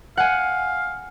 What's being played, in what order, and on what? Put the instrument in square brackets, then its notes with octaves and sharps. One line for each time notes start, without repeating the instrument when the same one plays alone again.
[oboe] F5 [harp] F#5 G#5